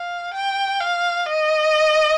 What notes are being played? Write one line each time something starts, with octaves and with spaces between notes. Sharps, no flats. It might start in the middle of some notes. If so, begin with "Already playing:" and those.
Already playing: F5
G5
F5
D#5